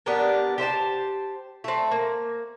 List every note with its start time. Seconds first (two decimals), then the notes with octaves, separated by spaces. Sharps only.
0.06 B3 D4 G4 A#4
0.58 G4 C5 D#5 A5
1.64 A3 C4
1.91 A#3